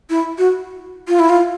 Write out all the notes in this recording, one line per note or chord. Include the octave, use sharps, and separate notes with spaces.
E4
F#4
F4
E4
F4